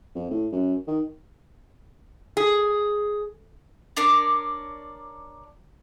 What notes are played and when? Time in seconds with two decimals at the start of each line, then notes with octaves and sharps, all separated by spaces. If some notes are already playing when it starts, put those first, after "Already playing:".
0.15 F2
0.30 A2
0.52 F#2
0.87 D#3
2.37 G#4
3.97 D4 A#4 C#5 D5